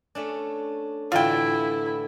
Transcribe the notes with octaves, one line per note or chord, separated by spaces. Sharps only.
A3 C#4 D4
A2 D3 E3 E4 F4 G5